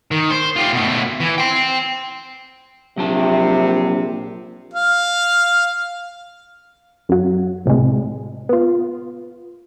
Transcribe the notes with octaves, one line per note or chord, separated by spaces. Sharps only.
D#3
C5
F4 G4
B2 A3
E3
G5 C6
A#1 C3 F#3 G4 A5
F5
F#2 F#3
C2 A2 C3 G#3
B3 F4